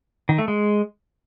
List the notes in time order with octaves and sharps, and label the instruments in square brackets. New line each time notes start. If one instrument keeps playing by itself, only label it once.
[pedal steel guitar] D#3
A3
G#3